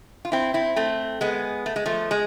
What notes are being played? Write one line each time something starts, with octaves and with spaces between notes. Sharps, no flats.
F4
C4 E4
C4 E4
A3 C4
G#3 B3
A3
G#3
F3 A3
G#3